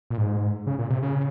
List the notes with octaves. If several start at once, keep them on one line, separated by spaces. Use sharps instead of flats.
A#2
G#2
C#3
A#2
C3
C#3